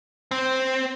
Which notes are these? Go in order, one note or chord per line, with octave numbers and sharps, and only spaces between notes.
C4